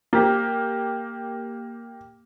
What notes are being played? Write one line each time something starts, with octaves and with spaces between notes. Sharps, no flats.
A#3 G4